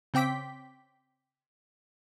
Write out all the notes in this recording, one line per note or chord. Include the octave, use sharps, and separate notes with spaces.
C#3 C4 G5 D6 B6